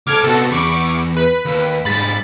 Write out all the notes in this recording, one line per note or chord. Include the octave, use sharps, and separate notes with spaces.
D2 A4 D6 F6 G#6
C3 B3 F#4 A4
E2 B5 C#6 D6
B4 B6
D#2
G#2 G3 B5 A6